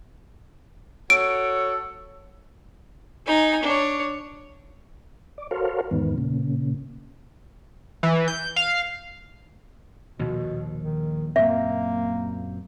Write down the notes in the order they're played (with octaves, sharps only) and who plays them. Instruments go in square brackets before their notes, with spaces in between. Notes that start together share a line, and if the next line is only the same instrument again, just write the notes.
[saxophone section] F#4 A4 C#5 [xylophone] D7
[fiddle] D#4 G#5
D4 C#5
[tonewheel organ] D5
F#4 A4 A#4 C5 C#5 F5
E2 G#2 D#3 B3
A#2 C#3
[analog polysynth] E3
G6
F5
[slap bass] A#1 D#2 [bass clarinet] B2
[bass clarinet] D#3
[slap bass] F#2 A#2 C4 [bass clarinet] A#3 [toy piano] E5